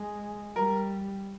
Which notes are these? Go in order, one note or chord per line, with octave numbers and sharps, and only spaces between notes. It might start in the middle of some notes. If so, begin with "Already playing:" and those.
Already playing: G#3
G3 A#4